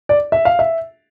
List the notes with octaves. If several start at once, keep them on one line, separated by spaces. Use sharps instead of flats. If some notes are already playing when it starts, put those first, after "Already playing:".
D5
E5
F5
E5